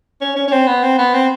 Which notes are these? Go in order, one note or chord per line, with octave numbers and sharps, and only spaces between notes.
C#4
C#4
C#4
C4
B3
C4
B3
C4